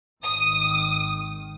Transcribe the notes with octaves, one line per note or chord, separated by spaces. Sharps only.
G#1 D#3 D#6